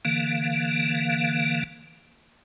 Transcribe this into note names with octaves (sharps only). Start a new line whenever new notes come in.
D3 E3 A#3 F5